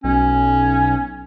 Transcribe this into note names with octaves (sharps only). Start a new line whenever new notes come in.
B1 C#4